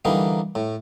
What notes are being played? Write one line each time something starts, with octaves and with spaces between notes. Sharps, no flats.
D3 E3 G3 A#3 D#4
A2